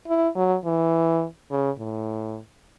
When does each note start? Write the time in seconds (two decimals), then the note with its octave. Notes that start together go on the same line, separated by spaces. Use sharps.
0.08 E4
0.36 F#3
0.65 E3
1.51 C#3
1.79 A2